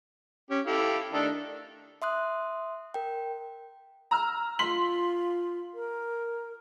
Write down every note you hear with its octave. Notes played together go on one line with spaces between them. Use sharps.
C#4 G4
E4 G4 A4 F5
D#3 A3 D4 A4
E5 C6 D#6 F#6
A#4 G5
A#5 E6 F6
F4 C6 B6 F#7
A#4